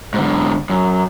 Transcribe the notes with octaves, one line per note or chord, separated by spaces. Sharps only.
G#2 D3
F#2